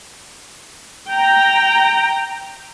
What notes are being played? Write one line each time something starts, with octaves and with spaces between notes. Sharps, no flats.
G5 A#5